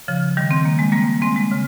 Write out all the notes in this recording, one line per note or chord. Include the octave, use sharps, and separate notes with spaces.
C#3 F3
D#3 G3
C4
A#3
G#3
G3 A#3
G#3 C4
G#3 C4
C#3